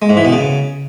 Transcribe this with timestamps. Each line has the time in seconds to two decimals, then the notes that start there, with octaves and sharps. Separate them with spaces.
0.02 G#3
0.09 G#2
0.17 E3
0.25 B2
0.32 C#3